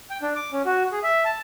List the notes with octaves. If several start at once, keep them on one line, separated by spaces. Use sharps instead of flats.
G5
D4
D6
C#4
F#4
G#4
E5
A5